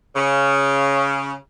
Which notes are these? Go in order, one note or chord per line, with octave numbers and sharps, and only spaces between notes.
C#3